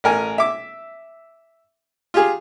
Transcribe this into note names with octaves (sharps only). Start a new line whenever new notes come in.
A1 A#4 G#5
E5 D6
F4 G4 G#4